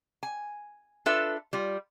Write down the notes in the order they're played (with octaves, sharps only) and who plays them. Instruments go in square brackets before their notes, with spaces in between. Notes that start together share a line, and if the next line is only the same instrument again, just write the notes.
[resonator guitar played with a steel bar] G#5
D4 F4 A4 B4 E5
G3 F4